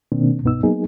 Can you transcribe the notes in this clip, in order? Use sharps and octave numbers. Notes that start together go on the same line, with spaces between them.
B2 D#3 A#3 C4 D4
C2 G2 B2 B3 D#4 E6
F#3 A#3 B3 D#4 G#4